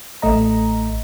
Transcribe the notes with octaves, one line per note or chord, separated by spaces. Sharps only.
A1 A3 D#5 A#5